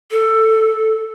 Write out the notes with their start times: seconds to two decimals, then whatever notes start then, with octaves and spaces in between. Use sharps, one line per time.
0.11 A4